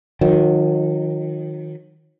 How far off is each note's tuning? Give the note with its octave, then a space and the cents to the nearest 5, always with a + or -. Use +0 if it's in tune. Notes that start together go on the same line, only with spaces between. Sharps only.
D#3 +0 F#3 -40